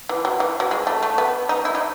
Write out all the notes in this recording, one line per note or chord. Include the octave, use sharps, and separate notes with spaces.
E3
F#3
E3
F#3
G#3
A3
A3
B3
D#4
E4
D#4